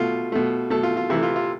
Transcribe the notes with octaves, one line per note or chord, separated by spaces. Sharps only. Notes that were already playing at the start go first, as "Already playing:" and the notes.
Already playing: B2 A3 F4
B2 A3
B2 A3 A4
F4
F4
C3 E3 A3 E4
F4
F4